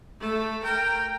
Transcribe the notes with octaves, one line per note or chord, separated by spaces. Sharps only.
A3 A4
A#4 G5